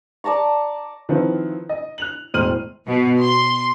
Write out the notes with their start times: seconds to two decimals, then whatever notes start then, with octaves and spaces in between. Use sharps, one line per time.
0.24 D5 A5 A#5 C#6
1.09 D#3 F3 C4 E4 B4
1.69 D#5
1.98 F#6 F7 F#7
2.34 E1 A2 C5 F6 D#7 F#7
2.87 B2
3.21 C6